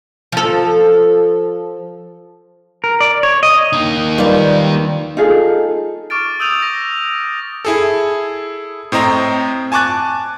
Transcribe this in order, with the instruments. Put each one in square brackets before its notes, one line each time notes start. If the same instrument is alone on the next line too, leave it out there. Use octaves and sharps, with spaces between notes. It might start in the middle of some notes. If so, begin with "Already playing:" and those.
[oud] F3 A4
[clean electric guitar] A#4
D5
C#5
D#5
[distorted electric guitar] A#3 D#4
[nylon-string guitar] D#3 G3 [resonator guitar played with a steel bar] F4 B4 D5
[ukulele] D#4 F4 G#4 A4
[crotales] C#6 D6 F6 A6 D7
D#6 E6 G6 D#7 F7 F#7
A#6
[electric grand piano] E4 G#4 A4
A2 C4 D#5 A#5
G#5 A5 C#6 D6 F#6 A6